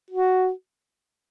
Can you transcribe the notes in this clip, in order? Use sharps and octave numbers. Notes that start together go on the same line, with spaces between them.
F#4